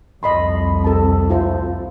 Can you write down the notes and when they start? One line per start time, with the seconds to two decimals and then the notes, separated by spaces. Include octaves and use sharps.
0.23 C2 F2 D#5 B5 C6
0.84 A4 A5
1.30 E4 F4 C5